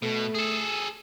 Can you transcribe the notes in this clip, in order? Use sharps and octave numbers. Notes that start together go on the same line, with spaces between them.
B2 A3
G#4 A4